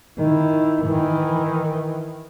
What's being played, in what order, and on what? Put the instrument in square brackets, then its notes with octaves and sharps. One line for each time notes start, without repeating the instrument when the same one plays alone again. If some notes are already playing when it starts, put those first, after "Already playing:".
[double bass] D#3 [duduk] E4
[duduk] D#3 [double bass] E3